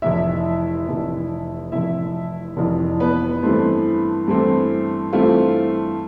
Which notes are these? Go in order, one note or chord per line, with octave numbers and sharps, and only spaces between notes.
F1 F2 E3 E4 E5
F1 F2 E3
F1 F2 E3 E4 E5
F1 F2 E3
B3 B4
G2 E3 A3 C4
G2 E3 A3 C4
G2 E3 A3 C4 F4